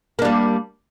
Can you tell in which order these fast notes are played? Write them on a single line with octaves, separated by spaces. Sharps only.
A#3 D4 G3